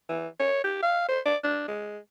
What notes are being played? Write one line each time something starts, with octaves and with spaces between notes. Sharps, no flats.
E3
C#5
G4
F5
C5
D5
D4
G#3